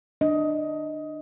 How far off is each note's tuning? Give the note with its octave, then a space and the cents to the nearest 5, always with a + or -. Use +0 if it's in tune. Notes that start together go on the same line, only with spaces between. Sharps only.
D4 +30 D#5 +15